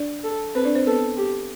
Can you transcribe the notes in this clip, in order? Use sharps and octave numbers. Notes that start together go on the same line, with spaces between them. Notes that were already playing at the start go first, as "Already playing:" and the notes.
Already playing: D4 D5
A4
C4 B4 C5
D4 D5
C4 C5
B3 A4 B4
G4